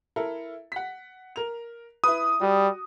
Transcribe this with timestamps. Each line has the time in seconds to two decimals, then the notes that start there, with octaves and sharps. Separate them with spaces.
0.16 E4 A4 A#4
0.72 F#5 B6
1.36 A#4 F7
2.04 E4 B4 D#6
2.41 G3 F#4